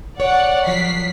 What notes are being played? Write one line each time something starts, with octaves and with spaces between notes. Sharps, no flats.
C#5 D5 F#5
F3 F#3 B6 C7